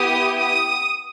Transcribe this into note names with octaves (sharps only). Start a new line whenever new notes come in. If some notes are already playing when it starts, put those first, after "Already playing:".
Already playing: B3 E4 G4 D#6
D#6